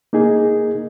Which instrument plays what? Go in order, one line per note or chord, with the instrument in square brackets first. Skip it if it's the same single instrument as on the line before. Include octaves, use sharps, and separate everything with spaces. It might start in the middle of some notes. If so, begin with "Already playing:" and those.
[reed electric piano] A#3 D#4 G#4